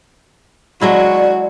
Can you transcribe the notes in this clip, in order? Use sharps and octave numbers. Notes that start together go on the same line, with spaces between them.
F#3 G#3 E4 F#4 D5